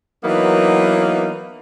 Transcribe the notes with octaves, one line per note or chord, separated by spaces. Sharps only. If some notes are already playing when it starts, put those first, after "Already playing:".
E3 F#3 A#3 B3 D#4